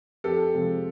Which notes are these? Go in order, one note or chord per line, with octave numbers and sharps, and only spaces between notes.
F2 G4 A4
C3 F3 G#3